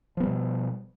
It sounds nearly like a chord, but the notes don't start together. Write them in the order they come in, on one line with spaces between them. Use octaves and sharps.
F3 B3 G3 B2